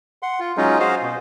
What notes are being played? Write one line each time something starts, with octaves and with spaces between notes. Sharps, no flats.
F#5 C6
F4
F#3 G#3 C#4 D#4 F4 G#4
F#4 G#4 C5 D#5 F5
B2